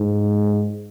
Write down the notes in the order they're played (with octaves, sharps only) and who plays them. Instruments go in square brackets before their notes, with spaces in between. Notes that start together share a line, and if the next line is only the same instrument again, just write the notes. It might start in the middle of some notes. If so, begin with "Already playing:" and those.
Already playing: [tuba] G#2